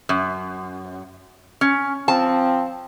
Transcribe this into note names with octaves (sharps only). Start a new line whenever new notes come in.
F#2
C#4
F3 C4 A5